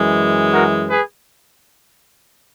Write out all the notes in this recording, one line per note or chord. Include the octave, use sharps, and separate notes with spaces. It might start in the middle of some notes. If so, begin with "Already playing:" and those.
Already playing: F#2 E3 G#3
F#4 A#4
G#4 B4